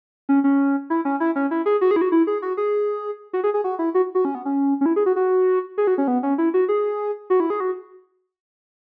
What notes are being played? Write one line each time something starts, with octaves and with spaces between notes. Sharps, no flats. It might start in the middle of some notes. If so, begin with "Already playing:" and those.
C#4
C#4
E4
C#4
E4
C#4
E4
G#4
F#4
G#4
E4
F#4
E4
G#4
F#4
G#4
F#4
G#4
G#4
F#4
E4
F#4
F#4
C#4
B3
C#4
C#4
E4
G#4
F#4
F#4
G#4
F#4
C#4
B3
C#4
E4
F#4
G#4
F#4
E4
G#4
F#4